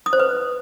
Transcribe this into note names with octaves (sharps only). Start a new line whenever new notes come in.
D#6
C5
B4